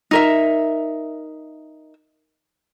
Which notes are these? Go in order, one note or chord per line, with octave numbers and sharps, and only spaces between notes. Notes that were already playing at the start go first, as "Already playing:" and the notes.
D#4 A#4 E5